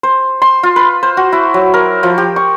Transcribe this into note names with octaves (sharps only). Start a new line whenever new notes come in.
C5
C6
F4
B4
C5
F#4
E4
F#3
A#4
F3
G4
C#6